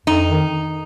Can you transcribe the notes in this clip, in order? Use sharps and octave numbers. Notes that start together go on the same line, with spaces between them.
F2 D#4
D#3